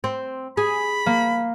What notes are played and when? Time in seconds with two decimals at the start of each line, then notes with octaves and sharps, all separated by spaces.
0.04 C4
0.57 G#4 B5
1.06 A#3